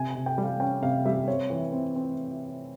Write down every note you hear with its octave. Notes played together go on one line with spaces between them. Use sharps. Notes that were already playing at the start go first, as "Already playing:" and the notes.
Already playing: C3 G#5
G#5
C3
G5
G3
F5
C#4 G5
C3 F5
G3 E5
C4 C#5
E3
C4
C4